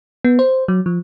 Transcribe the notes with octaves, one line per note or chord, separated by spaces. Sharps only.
B3
C5
F#3
F3